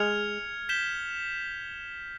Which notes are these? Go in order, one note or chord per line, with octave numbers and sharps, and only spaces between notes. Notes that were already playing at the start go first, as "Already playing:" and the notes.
Already playing: G#3 F6 G#6 C#7 F7
G6 B6 E7 G7